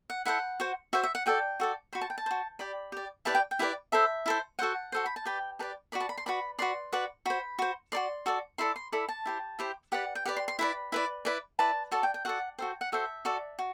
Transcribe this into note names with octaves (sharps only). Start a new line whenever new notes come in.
F#5
E4 A4 C5 F#5
F#4 C5
F#4 C5 E5
E5
F#5
F#4 A4 D5 G5
F#4 A4 D5
F#4 C5 B5
A5
G5
A5
F#4 C5
G4 D5 B5
G4 D5
E4 G4 B4 D5 A5
G5
G5
E4 G4 B4 D5
E4 A4 C5 E5
E4 A4 C5
F#4 A4 C5 F#5
F#4 A4 C5
B5
A5
G4 B4 D5 G5
G4 B4 D5 A5
F#4 B4 D5 B5
A5
B5
C6
F#4 B4 D5 B5
F#4 B4 D5 C6
F#4 B4 D5
F#4 C5 B5
F#4 C5
F#4 A4 D5 C6
F#4 A4 D5
E4 A4 D5 C6
C6
E4 A4 D5 B5
A5
E4 G4 C5
E4 G4 C5
G4 B4 D5 F#5
G5
G4 B4 D5 F#5
C6
C6
E4 B4 D5 B5
E4 B4 D5
E4 B4 D5
E4 B4 D5 A5
F#4 A4 D5 A5
G5
G5
F#4 A4 D5 F#5
F#4 A4 C5 G5
F#5
F#4 A4 C5 E5
F#4 A4 D5
F#4